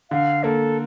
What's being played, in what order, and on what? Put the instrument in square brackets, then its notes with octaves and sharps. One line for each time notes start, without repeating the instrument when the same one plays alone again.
[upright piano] D3 [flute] F5
[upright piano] A#3 [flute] A4